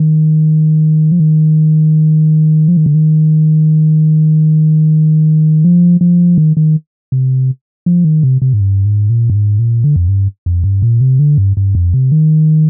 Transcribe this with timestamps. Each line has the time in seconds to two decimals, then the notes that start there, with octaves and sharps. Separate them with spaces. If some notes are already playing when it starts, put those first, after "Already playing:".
Already playing: D#3
1.12 F3
1.20 D#3
2.68 F3
2.77 D#3
2.86 D3
2.95 D#3
5.65 F3
6.01 F3
6.38 D#3
6.57 D#3
7.12 C3
7.86 F3
8.05 D#3
8.23 C3
8.42 C3
8.53 G#2
8.60 G2
8.85 G#2
9.10 A#2
9.30 G2
9.35 G#2
9.59 A#2
9.84 D3
9.96 F2
10.08 G2
10.46 F2
10.64 G2
10.82 A#2
11.01 C3
11.19 D3
11.38 G2
11.57 G2
11.75 F2
11.93 C3
12.12 D#3